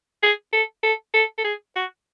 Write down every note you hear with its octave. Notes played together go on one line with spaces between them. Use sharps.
G#4
A4
A4
A4
A4
G#4
F#4